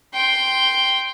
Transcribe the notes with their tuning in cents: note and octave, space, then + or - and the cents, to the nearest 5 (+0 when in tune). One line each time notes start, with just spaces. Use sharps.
G5 +0 C6 +0